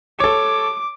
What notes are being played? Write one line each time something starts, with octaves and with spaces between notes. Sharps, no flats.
A4 C#5 D6